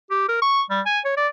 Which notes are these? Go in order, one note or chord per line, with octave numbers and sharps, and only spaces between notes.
G4
A#4
C#6
G3
G#5
C#5
D5